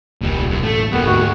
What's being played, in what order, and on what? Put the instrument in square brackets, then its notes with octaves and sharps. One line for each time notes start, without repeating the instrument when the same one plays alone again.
[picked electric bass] E1 C#2 [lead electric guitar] A#2 G3
[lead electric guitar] F#2
[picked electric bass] A1 F#2 [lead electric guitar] A3
[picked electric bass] E1 [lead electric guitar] G3 A#3 [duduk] B3
[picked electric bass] D2 G#2 A3 [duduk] F#4